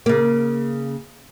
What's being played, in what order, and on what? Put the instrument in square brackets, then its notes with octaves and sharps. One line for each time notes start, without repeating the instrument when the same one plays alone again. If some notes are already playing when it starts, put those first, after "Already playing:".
[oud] C#3 A#3